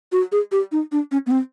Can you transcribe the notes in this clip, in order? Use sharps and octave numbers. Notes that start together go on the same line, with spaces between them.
F#4
G#4
G4
D#4
D4
C#4
B3
C4